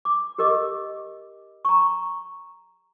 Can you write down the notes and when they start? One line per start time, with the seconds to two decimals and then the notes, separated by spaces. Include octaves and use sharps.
0.05 D6
0.38 G4 A#4 D#5 D6
1.65 A#5 C#6